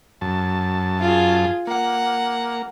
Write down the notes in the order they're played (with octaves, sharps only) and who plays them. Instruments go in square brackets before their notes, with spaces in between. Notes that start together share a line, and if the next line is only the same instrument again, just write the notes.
[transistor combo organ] F#2 A5
[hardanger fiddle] F4 G#4
[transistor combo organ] A#3 [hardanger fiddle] F#5